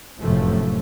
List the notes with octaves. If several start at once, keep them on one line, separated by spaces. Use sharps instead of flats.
F1 F#2 A2 C3 F3 A3